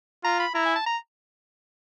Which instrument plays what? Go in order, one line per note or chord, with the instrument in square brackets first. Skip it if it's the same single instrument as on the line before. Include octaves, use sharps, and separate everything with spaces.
[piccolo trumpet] F4 [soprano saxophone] A#5
[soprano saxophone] B5
[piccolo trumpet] E4 [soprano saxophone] A#5
[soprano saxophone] G#5
A5
A#5